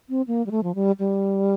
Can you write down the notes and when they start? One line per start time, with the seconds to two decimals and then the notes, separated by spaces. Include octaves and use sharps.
0.09 C4
0.28 A#3
0.46 G3
0.51 A3
0.63 F3
0.75 G3
0.99 G3